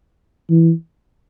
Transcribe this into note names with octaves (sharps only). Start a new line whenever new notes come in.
E3